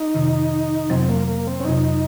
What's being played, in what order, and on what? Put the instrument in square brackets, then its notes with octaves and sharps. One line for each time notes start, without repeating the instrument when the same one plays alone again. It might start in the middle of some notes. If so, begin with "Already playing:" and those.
Already playing: [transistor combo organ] D#4
[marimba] F2 C3 D#3
[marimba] F2 C3 F#3 [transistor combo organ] C4
[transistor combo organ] A#3
A#3
C4
C#4
[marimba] F2 C3 F#3 [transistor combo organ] D#4